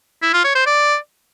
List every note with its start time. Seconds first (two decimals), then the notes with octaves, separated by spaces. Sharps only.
0.22 E4
0.33 F4
0.44 C#5
0.55 C5
0.66 D5